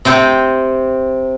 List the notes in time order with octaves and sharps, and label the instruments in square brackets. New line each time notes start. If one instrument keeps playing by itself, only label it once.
[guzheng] C3 C5 G5